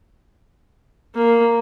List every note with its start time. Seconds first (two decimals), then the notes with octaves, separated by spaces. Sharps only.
1.15 A#3